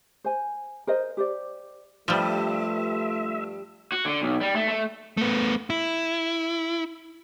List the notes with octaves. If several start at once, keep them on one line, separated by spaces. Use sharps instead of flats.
C5 G#5
A#4 C5 D#5
G4 C5 D5
G2 F3 G3 A3 F4 E5
F#4
D3
B1
G3
A3
A3
A3 B3
E4